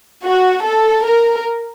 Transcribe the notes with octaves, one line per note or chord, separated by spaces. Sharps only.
F#4
A4
A#4